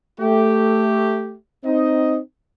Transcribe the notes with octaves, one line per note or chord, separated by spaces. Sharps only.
A3 G4
C4 D#4 D#5